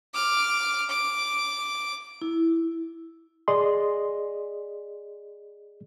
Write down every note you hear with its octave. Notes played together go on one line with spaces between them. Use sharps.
D6 F6
D6
E4
G#4 D5 D#5 C6